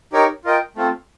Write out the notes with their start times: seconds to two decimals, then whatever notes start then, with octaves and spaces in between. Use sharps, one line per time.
0.13 D#4 G4 A#4 C#5
0.44 F4 A#4 D#5 G5
0.76 A3 C4 F4